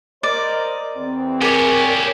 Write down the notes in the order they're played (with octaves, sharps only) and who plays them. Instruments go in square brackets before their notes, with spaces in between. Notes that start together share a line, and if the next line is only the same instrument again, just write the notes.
[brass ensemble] A#4 C5 D#5 [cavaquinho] D5
[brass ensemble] E2 C4
[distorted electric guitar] G4 C#5 [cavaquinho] G#4 D5 [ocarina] A#4